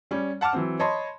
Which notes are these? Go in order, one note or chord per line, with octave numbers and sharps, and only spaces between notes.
G3 C#4
F#5 A5 D6 F6
E3 F#3 C4
C#5 D#5 A5 B5 C6